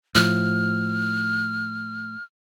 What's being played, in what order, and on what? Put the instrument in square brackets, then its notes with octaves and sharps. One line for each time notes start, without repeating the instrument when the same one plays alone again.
[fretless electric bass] A2 F3 [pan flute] F6